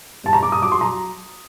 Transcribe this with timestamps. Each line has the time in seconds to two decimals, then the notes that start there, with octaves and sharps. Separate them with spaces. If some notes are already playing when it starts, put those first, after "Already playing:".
0.24 G2 A5
0.33 A#5
0.43 G2 D6
0.52 D#6
0.62 F#3 D6
0.72 C6
0.81 F#3 A#5